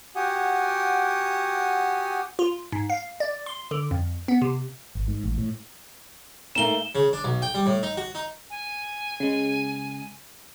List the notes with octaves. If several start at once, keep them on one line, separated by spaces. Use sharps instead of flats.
F#4 G4 F#5 G#5 D#6
F4
G#2
F5
D5
C6
D3
F2
B3
C3
G#1
G#2
A1
A2
G#2 A3 A#3 E7 G7
C#3
D4
B1
G5
G3
A2
D#4
F#4
D#4
G#5
C#3 G#3